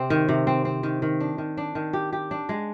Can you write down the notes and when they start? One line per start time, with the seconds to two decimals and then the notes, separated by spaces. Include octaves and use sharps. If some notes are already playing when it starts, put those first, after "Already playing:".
Already playing: C3 C4
0.10 D#3
0.29 C3
0.47 C4
0.65 C4
0.83 D#3
1.02 D#3
1.20 D4
1.38 D#3
1.57 D4
1.75 D#3
1.93 G4
2.13 G4
2.31 D4
2.49 G#3